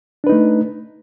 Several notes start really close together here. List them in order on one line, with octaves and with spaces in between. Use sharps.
D4 B4 D#4 A3